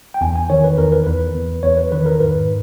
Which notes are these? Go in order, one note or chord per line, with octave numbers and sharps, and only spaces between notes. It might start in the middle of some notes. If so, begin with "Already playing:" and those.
G5
E2 G#5
G#5
D#3 C#5
B4
E2 A#4
B4
E2 B4
E2
E2 C#5
B4
D#3 B4
A#4
G#2 B4